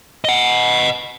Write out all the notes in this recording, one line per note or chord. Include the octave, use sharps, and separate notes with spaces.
D#5 F#5